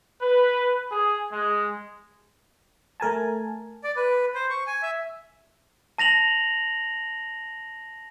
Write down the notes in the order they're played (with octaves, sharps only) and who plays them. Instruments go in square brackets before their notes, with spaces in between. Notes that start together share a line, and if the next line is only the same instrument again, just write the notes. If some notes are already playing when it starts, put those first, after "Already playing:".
[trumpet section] B4
G#4
G#3
[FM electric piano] A3 A#4 G#5 A5
[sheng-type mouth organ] D5
B4
C5
C#6
G#5
E5
[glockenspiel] A5 A#6 F7 F#7